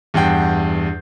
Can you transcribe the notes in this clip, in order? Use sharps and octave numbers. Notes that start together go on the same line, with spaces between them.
E2 G2 F#5 G5 G6